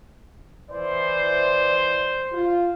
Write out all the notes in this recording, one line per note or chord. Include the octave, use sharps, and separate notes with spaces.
E3 C5 D5
F4